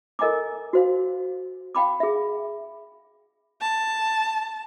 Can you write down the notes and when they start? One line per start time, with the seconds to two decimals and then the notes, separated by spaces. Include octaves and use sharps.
0.19 A4 A#4 D#5 G#5 A#5 D6
0.73 F#4 C5 F5
1.75 F5 G5 B5 D6
2.00 G#4 E5
3.62 A5